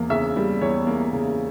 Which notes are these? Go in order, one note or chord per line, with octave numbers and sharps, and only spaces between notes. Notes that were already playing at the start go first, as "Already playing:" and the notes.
Already playing: E2 A#3
C#3 E5
G3
E2 C#5
A#3
C#3